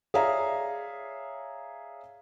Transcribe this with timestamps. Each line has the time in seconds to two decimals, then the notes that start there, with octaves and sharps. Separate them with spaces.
0.14 G#4 C#5 D5 E5 F5 A#5